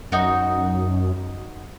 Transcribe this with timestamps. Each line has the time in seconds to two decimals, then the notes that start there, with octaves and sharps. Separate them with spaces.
0.12 F#2 D#4 F#4